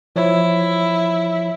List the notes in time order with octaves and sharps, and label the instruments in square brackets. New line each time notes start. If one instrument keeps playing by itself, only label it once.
[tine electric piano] F3 C#5 [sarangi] E4